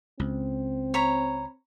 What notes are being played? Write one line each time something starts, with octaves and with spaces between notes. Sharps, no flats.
C#2 C4
C#5 A#5 B5